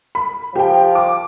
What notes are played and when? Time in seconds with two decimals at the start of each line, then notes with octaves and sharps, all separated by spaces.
0.15 B5
0.55 F3 G4 G5
0.95 D6